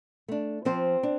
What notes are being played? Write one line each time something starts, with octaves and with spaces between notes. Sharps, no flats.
A3 D4
F3 C4 C5
D4